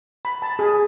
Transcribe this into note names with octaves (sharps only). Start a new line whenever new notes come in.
B5
A5
G#4